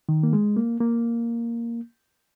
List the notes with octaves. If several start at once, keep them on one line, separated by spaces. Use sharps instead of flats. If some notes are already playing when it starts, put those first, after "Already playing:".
D#3
A#3
G#3
A#3
A#3